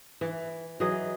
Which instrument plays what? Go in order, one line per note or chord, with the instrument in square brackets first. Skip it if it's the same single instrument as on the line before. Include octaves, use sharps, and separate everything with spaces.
[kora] E3
E3 F#3 G#4 D#5